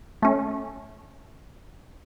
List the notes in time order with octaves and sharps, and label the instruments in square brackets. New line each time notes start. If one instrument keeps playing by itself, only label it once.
[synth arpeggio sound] A3 C#4